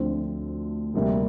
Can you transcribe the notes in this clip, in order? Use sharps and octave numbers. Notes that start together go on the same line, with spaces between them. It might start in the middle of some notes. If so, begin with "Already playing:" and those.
Already playing: D2 D3 F3 C4
D2 C3 G3 A#3